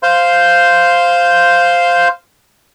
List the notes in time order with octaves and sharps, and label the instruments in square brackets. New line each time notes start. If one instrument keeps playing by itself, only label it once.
[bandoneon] C5 F5 C6 G6